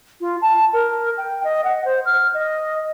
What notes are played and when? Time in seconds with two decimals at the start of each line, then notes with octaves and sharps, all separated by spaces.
0.21 F4
0.42 A5
0.73 A#4
1.18 G5
1.44 D#5
1.64 F#5
1.85 C5
2.06 F6
2.34 D#5